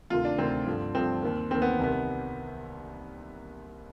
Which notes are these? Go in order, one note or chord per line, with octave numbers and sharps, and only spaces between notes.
D2 C3 D#3 F4
D4
D2 C3 D#3 C4
G2 D3 F3
G2 D3 F3 C4
D#2 D#3
D#2 D#3 C4
B3
C2 C3 D#3 B3